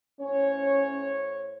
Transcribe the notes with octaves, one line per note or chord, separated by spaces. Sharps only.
A2 C#4 C5 C#5